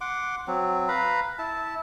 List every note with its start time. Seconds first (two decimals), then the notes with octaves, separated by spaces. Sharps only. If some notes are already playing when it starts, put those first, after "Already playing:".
0.01 F#5 C6 D6
0.47 F#3 C4
0.88 B4 F5 A#5 B5
1.39 E4 A5